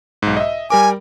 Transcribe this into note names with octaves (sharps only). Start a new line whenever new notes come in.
B1 G#2
D#5 E5
G3 A#4 G#5 D6